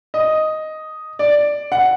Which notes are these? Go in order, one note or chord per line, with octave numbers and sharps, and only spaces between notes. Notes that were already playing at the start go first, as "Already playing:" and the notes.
D#5
D5
F#5